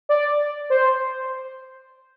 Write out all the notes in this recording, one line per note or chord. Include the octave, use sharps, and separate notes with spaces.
D5
C5